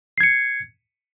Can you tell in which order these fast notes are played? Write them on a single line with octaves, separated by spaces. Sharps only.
C7 G#6 C#7